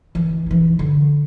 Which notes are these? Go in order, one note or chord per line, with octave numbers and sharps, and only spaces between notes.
E3
E3 D#4
D3